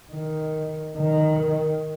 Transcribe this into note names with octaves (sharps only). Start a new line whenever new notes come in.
D#3
D#3